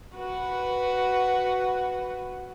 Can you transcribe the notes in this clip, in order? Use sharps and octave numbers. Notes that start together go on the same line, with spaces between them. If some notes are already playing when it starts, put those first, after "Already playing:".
F#4 B4